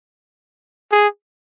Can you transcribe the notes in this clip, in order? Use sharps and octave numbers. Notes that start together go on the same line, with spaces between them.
G#4